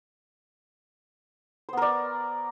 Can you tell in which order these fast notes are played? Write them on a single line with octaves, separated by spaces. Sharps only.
C5 B3 A#4 D5